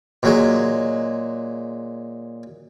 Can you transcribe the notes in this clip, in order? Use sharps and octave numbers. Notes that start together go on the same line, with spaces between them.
A#2 F#3 G#3